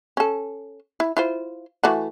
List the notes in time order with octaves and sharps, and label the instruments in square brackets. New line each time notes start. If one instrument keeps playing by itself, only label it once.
[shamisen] C#4 A4
E4
E4 F4 C5
E3 A3 F#4